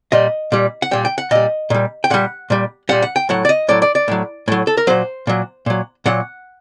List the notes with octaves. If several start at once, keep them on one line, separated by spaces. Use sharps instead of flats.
A#2 G3 D#5
A#2 G3
F#5
A#2 G3 G5
G5
F#5
A#2 G3 D#5
A#2 G3
G5
A#2 G3 F#5
A#2 G3
A#2 G3 F#5
F#5
G5
A2 F#3 F#5
D5
D#5
A2 F#3 D5
D5
D5
A2 F#3
A2 F#3
A4
A#4
A#2 F#3 C5
A#2 F#3
A#2 F#3
A#2 F#3 F#5